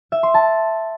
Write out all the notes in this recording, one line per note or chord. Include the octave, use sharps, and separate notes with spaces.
E5
C6
A5